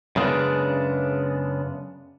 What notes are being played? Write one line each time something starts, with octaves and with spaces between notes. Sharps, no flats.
F#2 C#3 G#3 A3 B3 D4